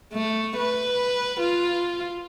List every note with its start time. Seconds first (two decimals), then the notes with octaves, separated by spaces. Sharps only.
0.13 A3
0.58 B4
1.41 F4